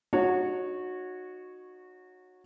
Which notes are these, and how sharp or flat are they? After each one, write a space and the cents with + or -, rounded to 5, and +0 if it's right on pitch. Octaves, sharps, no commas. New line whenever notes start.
D#4 -30 F#4 -15 C#5 -5